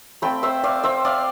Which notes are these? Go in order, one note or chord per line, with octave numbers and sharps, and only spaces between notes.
A3 C4 F4 G5 B5
C5 E5
D5 F5
C5 E5
D5 F5